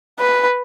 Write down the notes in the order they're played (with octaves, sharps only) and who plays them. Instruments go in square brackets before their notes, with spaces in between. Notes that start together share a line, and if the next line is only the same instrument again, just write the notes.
[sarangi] B4